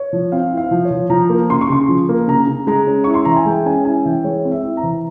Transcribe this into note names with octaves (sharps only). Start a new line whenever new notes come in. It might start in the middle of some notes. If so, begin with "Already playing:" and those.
Already playing: C#5
F3
C4 F5
E4
F5
F3
C#5
F3
F3 A#5
A#3
C#3 C6
C#6
C#3 C6
F3
A#3
C#3 A#5
C#3
G#3 A#5
C#4
E4 C#6
C6
E3 A#5
G#5
G#3 G5
C#4 G#5
E4 G#5
E3 G5
G#3 C#5
C4
E5
E4
A#5
E3